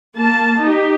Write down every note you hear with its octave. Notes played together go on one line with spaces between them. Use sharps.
A#3 A5
D#4 G4